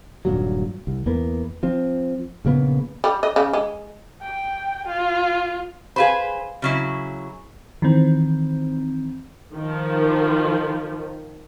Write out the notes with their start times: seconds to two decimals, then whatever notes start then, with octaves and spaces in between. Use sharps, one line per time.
0.25 D#1 G2 A#2 F#3
0.87 C2
1.06 E2 A#3 B3
1.63 F3 C4
2.45 A#1 C#3 A#3 B3
3.04 G3
3.23 D#5
3.36 C#3
3.53 G#3
4.22 G5
4.87 F4
5.96 G#4 B4 C5 F5 B5
6.62 C#3 F#3 E4
7.82 D#3 E3 C4
9.55 D#3 F3